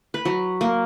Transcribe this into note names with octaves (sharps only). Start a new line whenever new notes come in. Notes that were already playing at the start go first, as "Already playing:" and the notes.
B4
F#3
A#3